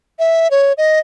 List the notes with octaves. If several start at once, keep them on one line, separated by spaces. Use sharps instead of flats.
E5
C#5
D#5